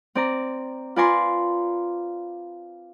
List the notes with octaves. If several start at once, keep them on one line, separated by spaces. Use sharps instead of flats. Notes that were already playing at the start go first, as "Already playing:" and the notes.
C4 D5 A#5
F4 B4 D5 G#5 A#5 C6